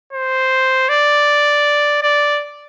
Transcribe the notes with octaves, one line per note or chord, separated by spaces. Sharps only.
C5
D5
D5